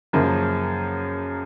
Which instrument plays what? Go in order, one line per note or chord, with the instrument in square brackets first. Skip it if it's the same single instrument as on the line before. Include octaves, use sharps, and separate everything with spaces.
[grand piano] F#2 C#3 F3 A#3